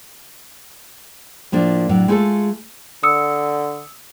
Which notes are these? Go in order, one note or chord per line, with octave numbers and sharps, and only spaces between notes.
A2 F3 A#3 D4
A2 F#3 D4
G#3 A3 E4 F4 A4
D3 D#6 E6 C#7